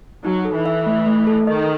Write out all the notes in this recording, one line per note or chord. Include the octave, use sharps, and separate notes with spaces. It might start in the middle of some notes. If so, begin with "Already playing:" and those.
F#3 D#4
A4
E3
E5
A3
A3
A4
D#3 D#5